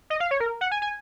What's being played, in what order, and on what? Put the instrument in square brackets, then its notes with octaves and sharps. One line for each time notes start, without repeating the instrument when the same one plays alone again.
[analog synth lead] D#5
F5
C#5
A#4
F#5
G#5
G#5